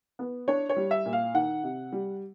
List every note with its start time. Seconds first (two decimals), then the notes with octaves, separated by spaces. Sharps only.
0.19 B3
0.48 D4 C#5
0.69 C#5
0.76 G3
0.91 E5
1.06 A#2
1.13 F5
1.34 D#3 F#5
1.63 C3
1.92 G3